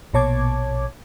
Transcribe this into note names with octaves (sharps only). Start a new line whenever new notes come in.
A#1 B2 C#5 A5 D6 G#6